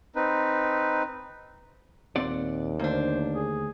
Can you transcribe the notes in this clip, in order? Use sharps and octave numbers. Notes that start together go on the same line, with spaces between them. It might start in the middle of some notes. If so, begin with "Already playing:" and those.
C4 D#4 B4
D#2 A#2 C4 D5 F#5
D2 A#3 D4 C5
G#4